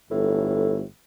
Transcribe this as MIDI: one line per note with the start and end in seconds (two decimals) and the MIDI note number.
0.11 0.83 31
0.11 0.84 45